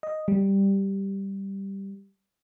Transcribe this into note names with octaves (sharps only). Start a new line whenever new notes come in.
D#5
G3